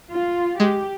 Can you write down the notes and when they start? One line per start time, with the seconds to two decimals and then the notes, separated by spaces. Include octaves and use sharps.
0.11 F4
0.60 G#3 G4